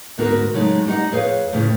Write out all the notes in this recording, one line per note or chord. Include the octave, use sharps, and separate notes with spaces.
D2 G#2 B3 C4 F#4 A#4
C#3 F#3 G#3 A3 D#4
G3 D#4 G4 D#5 F#5
F2 G#4 B4 C#5 F5
F2 A2 C#3 C#4